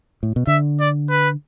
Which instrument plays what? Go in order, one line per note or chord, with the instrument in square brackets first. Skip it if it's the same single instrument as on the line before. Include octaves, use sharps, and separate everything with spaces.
[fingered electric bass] A2
B2
[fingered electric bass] D3 [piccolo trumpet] E5
[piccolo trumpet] D5
B4